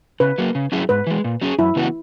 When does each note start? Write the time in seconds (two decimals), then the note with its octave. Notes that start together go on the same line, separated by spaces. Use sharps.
0.20 C#3 B4
0.38 F#3 A#3
0.55 C#3
0.72 F#3 C#4 E4 G#4
0.89 G#2 B4
1.07 E3 G#3
1.24 A#2
1.42 F#3 C#4 G#4
1.59 F#2 E4
1.76 C#3 E3 B3 F#4